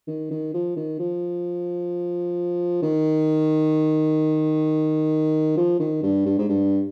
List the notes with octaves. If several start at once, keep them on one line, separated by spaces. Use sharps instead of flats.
D#3
D#3
F3
D#3
F3
D#3
F3
D#3
G2
G2
G#2
G2